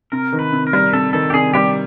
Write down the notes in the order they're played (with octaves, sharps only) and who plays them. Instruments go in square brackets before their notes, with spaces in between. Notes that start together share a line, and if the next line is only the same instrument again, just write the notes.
[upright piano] C3 [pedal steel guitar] A#4
[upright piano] D#3
[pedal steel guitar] B4
[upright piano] C3
[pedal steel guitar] A#4
[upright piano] G3
[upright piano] C3 [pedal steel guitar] A4
[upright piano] D#3 [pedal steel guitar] A4
[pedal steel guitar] G4
[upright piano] C3 [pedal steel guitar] G#4
[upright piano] G3 [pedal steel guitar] G4